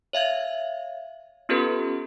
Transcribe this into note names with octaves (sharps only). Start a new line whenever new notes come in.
C#5 E5 F5 G#6
B3 C#4 F4 G4 A4 B4